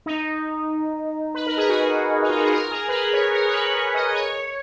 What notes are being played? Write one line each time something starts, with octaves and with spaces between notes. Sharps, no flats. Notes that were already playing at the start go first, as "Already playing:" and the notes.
D#4
B4
A#4
G#4
F#4
D#4
F4
F#4
G#4
A#4
G#4
B4
A#4
C#5
A#4
C#5
B4
C#5
D#5
C#5